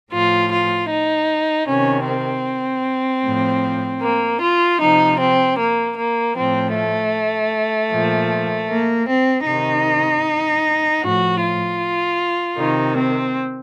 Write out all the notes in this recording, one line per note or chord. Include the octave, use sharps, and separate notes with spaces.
A2 F3 F4
F4
D#4
C3 D#3 C#4
C4
A2 F3
A#3
F4
C3 F3 D#4
C4
A#3
A#3
A2 F3 C4
A3
A#2 F3
A#3
C4
C3 D#3 D#4
A2 F3 F#4
F4
C3 D#3 D#4
C4